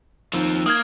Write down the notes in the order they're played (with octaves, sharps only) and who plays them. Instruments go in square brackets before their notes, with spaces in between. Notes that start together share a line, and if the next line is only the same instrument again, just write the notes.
[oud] D#2 [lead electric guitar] F3 C4
[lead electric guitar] A#3 [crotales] D#6 F6 G#6